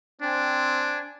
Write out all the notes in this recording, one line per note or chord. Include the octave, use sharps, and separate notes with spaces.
C4 D4 G#5